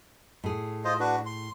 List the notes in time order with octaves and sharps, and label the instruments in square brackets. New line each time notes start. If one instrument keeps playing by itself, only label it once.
[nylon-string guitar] A2 G#4
[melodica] F4 C5 D#5
D4 F#4 B4
C6